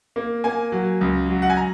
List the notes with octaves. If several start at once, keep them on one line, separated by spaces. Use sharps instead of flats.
A#3
A#3 G#5
F#3
C#2
F#3
F#5
G#5
A#5